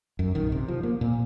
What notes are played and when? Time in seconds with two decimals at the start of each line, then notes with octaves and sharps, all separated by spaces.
0.19 F#2
0.35 A#1 F#2 D#3
0.52 C3
0.68 F3
0.83 A#3
1.01 A#2